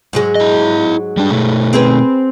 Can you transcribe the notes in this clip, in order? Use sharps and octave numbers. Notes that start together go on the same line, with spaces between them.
G#2 F#3 G#3
E4 D#5
G3 D4
B2 A3
C4 G#4 B4